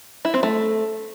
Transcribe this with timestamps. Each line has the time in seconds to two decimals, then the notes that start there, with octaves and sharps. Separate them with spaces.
0.25 E4
0.34 C4
0.43 A3